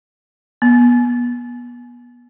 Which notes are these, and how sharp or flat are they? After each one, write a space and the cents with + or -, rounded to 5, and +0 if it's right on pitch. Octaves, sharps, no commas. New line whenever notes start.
B3 -30